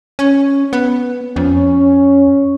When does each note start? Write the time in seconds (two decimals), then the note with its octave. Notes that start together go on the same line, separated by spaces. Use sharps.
0.19 C#4
0.73 B3
1.36 F2 C#4